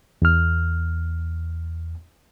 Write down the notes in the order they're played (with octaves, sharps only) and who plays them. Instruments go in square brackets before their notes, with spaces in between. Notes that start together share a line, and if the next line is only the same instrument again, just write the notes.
[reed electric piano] E2 F6